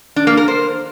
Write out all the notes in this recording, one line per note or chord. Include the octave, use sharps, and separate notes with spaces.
D4
A#3
A#4
C5